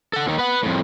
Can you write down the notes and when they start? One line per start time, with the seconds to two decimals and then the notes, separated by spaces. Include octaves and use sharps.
0.13 A4 F#5
0.26 D#2 D#3
0.38 B4 F#5
0.63 F2 A2